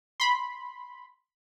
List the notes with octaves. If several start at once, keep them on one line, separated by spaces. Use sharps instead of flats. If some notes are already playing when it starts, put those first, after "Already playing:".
B5 C6